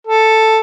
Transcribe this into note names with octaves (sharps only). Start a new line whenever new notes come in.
A4